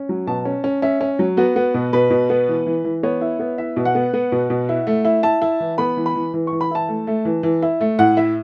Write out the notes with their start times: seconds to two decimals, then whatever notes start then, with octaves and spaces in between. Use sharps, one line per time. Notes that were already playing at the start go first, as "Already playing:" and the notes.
Already playing: C#4
0.09 F#3
0.27 B2 A5
0.45 C#4
0.64 C#4
0.82 C#4 E5
1.01 C#4
1.19 F#3
1.37 B3 F#4
1.56 B3
1.74 B2
1.93 B2 B4
2.11 B2
2.30 B3
2.48 E3
2.67 E3
2.84 E3
3.03 B3 C#5
3.21 E4
3.39 B3
3.58 E4 E5
3.77 B2
3.85 F#5
3.95 B3
4.13 B3
4.32 B2
4.50 B2
4.69 E4
4.87 A3
5.05 E4
5.23 E4 A5
5.42 E4
5.60 E3
5.78 B3 B5
5.97 E3
6.06 B5
6.15 E3
6.34 E3
6.47 C#6
6.53 E3
6.61 B5
6.71 E4 A5
6.89 A3
7.07 A3
7.25 E3
7.43 E3
7.62 E4
7.81 A3
7.99 A2 F#5
8.17 E4 E5